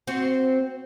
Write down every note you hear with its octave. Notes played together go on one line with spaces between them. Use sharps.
C4 F#4